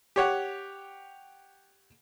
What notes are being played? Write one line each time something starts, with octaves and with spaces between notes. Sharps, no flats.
G4 C#5 F#5